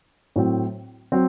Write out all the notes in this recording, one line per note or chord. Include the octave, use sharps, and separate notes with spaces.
A2 F#3 C4
F#3 C4